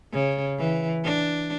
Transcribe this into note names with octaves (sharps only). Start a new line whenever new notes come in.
C#3
E3
D4